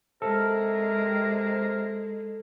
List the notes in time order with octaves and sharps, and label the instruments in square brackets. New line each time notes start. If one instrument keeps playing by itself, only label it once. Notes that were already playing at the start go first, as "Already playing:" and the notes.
[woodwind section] C3 A#4 [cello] G#3 [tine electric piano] A4